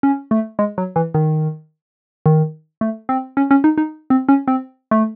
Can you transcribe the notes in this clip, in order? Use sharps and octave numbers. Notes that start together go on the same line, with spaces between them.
C#4
A3
G#3
F#3
E3
D#3
D#3
A3
C4
C#4
C#4
D#4
D#4
C4
C#4
C4
A3